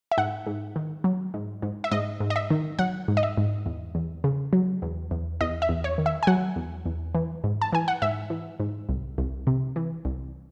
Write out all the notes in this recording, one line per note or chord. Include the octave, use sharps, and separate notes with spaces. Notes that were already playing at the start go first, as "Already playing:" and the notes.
E5
G#2 F#5
G#2
D#3
F#3
G#2
G#2
E5
G#2 D#5
G#2
D#5
E5
D#3
F#3 F#5
G#2
D#5
E5
G#2
E2
E2
C#3
F#3
E2
E2
E2 D#5
E5
E2
C#5
D#3
E5
G#5
F#3 F#5
E2
E2
E3
G#2
A5
E3 G#5
F#5
G#2 E5
E3
G#2
C2
C2
C3
E3
C2